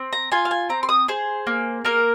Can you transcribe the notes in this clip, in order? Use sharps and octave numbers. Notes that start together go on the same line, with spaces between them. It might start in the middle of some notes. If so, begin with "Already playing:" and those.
Already playing: C4
A#5
F4 G#5
F5
G#5
C4 A#5
C6
D#6
G#4 C5
A#3
A#3 A#4